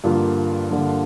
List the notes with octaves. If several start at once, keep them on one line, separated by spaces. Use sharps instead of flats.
G2 D3 F3 A#3 F4
G2 D3 F3 A#3 F4